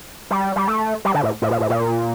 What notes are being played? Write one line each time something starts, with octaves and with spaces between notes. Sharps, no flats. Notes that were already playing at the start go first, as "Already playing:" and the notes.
G3
G3
A3
G3
D3
A2
A2
A#2
A2
A#2